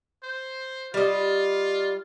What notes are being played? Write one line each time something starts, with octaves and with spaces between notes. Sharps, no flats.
C5
G3 F4 D#5